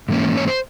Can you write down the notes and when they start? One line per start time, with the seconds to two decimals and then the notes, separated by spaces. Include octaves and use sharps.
0.09 G#2 E3 A#3 C#4
0.37 C#5
0.48 C5